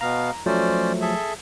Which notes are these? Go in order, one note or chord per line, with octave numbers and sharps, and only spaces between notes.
B2 B3 F5 A#5
F3 F#3 A3 C#4 C5 D5
G#4 A4 E5